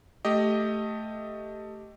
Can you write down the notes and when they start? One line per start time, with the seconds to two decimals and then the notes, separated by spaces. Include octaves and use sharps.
0.25 A3 G4 D#5